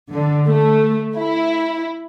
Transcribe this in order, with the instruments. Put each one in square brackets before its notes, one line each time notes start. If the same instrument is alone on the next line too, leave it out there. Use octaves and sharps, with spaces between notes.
[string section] D3
A3
E4